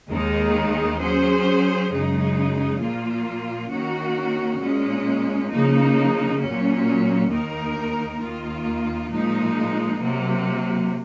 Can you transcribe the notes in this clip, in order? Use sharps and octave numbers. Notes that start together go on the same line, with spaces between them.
D#2 D#3 G#3 D#4 G#4
F#3 C#4 G#4 C5
F#2 C#3 G#3 D#4 G#4
A#2 F3 A#3 F4
D#3 A#3 C#4 F#4
A#2 G#3 C#4
C#3 F3 A#3 D#4
A#2 F#3 C#4
D#2 D#3 A#3 D#4 A#4
D#2 D#3 A#3 F4
A#2 F3 G#3 D#4
C3 F#3 A#3